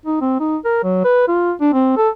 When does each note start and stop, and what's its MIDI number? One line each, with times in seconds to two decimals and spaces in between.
0.06 0.19 63
0.21 0.37 60
0.40 0.57 63
0.65 0.81 70
0.84 1.03 54
1.04 1.27 71
1.28 1.52 65
1.61 1.69 62
1.73 1.93 60
1.97 2.09 69